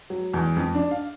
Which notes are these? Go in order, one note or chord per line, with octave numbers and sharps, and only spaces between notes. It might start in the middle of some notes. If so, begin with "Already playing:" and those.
F#3
E2
F2
D4
F5